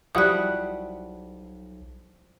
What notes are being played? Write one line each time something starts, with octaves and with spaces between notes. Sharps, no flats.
B1 F3 G3 E4 F#4 F#5 D#6 F#6